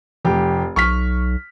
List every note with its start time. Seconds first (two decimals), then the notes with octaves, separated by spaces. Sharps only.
0.25 F1 G4
0.76 B1 C#6 F6 B6